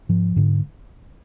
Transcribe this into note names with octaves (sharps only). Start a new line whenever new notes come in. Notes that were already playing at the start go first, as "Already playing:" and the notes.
G#2 F3
G#2 D3